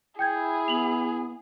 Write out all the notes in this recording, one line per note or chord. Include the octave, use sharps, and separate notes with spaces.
E4 G#4 G5 G6 G#6
B3 F7 F#7